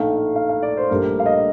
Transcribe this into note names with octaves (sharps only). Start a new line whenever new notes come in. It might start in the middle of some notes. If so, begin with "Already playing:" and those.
Already playing: A#1 A2 A3 D#4 F5
F5
F5
D5
C5
A#1 A2 G3 D4 A#4
F5
D#5